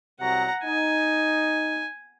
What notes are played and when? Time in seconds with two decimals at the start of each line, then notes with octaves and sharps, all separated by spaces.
0.20 C2 C3 F#3 F#5 A#5
0.64 D#4 G#5